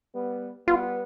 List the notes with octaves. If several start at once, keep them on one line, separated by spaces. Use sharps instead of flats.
G3 B3
G3 B3 F4